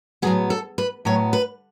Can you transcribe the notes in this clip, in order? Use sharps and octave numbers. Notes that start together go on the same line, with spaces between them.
A2 F#3 B3 G#4
A4
B4
A2 F#3 B3 C#5
B4